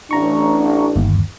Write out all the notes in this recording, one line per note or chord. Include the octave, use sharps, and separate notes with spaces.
A1 D4 A#5 C#6
G1 D#2